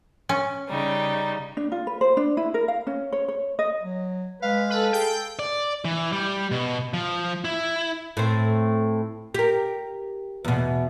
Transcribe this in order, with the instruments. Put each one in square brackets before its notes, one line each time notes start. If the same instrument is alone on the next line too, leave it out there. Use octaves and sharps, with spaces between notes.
[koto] C#4
[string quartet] C#3 G3 D#4
[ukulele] D4
F4
B4
C5
D4
E4
A#4
F5
C#4
C#5
C#5
D#5
[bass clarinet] F#3
[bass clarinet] G#3 [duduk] B4 [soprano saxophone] F5
[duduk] A4 [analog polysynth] B4
[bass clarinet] G#4 [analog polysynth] G5
[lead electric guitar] D5
E3
G3
B2
F3
E4
[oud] A2 C4
G4 A#4
E2 B2